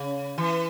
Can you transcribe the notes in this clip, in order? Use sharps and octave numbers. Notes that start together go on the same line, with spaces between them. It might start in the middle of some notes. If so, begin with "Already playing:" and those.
Already playing: C#3
E3